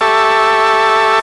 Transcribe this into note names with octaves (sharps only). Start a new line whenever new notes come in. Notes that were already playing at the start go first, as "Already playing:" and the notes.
G4 A4 E5 A5 C#6